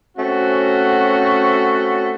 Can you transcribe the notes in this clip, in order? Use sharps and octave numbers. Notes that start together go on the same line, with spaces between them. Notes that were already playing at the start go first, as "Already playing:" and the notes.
A3 C4 C#4 F#4